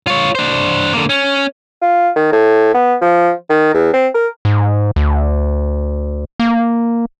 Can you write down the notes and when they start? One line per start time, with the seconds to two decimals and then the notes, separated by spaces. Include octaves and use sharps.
0.07 F4 C#5
0.35 D4 C5
0.93 D3 A#3
1.09 C#4
1.82 F4
2.16 D#3
2.32 A2
2.74 B3
3.02 F3
3.50 D#3
3.74 E2
3.93 C4
4.14 A#4
4.45 G#2
4.96 D2
6.40 A#3